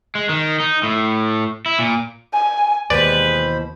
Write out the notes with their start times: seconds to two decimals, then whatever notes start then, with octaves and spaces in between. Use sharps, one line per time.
0.15 G#3
0.29 D#3
0.60 D#4
0.83 A2
1.66 E4
1.79 A#2
2.33 G#5
2.90 D#2 B2 E3 G#3 B4 C5 D5 B5